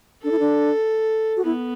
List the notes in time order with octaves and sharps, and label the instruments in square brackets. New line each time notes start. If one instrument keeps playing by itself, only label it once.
[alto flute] D4 [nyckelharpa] A4
[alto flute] E4
D4
F#4
[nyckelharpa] B3 [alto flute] E4